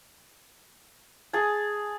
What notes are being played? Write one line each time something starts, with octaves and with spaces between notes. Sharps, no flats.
G#4 A5